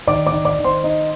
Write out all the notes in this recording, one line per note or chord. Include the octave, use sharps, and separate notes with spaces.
D#3 D5 D6
D5 D6
D#3
D5 D6
D#3
C5 C6
D#4